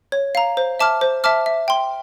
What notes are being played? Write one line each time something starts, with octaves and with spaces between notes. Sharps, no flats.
C#5
F5 A#5
C5
E5 A5 D6 F6
C5
E5 A5 D6 F6
E5
G5 C6